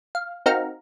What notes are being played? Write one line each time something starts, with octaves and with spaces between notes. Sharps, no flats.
F5
C4 D#4 F#4 A#4 F5 A#5